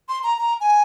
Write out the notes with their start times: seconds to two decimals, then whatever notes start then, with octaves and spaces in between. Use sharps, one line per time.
0.09 C6
0.24 A#5
0.38 A#5
0.60 G#5